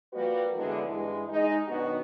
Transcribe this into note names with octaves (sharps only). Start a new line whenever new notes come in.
F3 G3 A#3 F#4 B4
F#2 D3 E3 G#3 B3 D4
G2 E3 G#3
G#3 D#4
B2 D#3 F#3 B3 D4 F#4